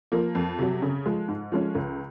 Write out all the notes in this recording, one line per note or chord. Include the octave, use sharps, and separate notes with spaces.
F3 A#3
F2
C3 F#3
C#3
F3 G#3
G#2
F3 G#3 C#4
C#2